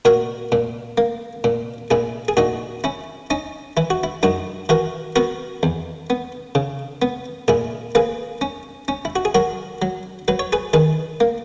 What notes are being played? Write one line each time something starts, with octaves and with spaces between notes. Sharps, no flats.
A#2 F#4 A#4
A#2
A#3
A#2
A#2 E4 G#4
G#4
A#2 D#4 F#4
C#4 E4
C#4 D#4
E3 E4
F#4
E4
F#2 D#4 F#4
E3 F#4 A#4
B3 F#4 A#4
E2
B3
C#3
B3
A#2 E4 G#4
A#3 G#4 B4
C#4
C#4
E4
F#4
G#4
F#3 F#4 A#4
F#3
F#3 B4
C#5
G#4 B4
D#3 G#4 B4
A#3